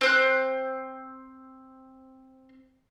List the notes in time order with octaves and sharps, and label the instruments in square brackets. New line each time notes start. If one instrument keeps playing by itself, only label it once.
[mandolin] C4 C5 F#6